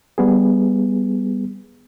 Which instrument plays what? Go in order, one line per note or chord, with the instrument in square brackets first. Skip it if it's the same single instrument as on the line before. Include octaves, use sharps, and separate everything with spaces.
[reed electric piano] G3 B3 G#4